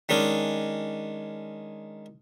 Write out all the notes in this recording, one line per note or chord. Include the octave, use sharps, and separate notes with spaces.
D#3 G#3 C#4 D4